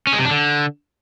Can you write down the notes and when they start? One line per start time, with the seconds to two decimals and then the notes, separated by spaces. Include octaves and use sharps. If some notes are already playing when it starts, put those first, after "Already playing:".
0.07 C#4
0.13 G#3
0.19 C3
0.25 D4
0.31 D3